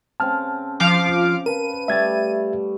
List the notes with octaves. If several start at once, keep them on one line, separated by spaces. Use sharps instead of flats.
C#3 C4 A5 F6
F3 F5 D6
A#4 B4 F5 A5 D#7
G3 A3 E5 G#6 A6